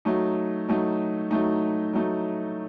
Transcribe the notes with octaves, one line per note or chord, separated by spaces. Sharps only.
F#3 A3 D#4
F#3 A3 D#4
F#3 A3 D#4
F#3 A3 D#4